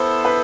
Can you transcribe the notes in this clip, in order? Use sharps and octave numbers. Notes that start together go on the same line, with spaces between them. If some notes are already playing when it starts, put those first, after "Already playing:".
Already playing: B3 E4 A4 C5
B4